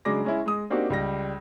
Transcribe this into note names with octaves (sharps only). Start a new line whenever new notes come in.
C#3 F#3 G#3 D4 D6 A#6
G#3 C#4 E4
G#3 D#6
A#3 C4 D4 D#4 F#4 G4
C#2 G3 A#6